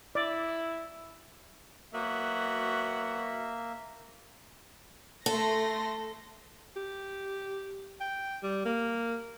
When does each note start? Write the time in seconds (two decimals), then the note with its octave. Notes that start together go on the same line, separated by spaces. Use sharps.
0.15 E4 D5
1.93 F#3 A#3 B3 F#4 E5
5.26 A3 A4 C6 A#6
6.77 G4
8.01 G5
8.43 G3
8.65 A#3